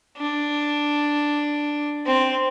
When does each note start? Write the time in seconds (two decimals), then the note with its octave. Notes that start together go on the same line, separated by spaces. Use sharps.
0.17 D4
2.06 C4